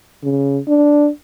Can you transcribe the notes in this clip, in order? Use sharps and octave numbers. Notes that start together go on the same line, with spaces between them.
C#3
D4